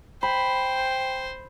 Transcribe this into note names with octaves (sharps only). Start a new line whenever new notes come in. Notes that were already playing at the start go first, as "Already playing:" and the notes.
C5 G5 B5